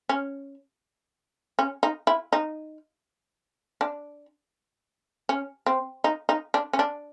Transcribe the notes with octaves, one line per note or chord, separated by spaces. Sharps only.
C#4
C#4
D#4
E4
D#4
D4
C#4
C4
D#4
D#4
D4
C#4
D4